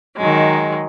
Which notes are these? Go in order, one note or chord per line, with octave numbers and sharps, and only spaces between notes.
D#3 F#3 G#3